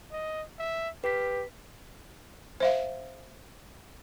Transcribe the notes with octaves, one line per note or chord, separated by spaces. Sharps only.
D#5
E5
G4 B4 B6
C5 E5 F5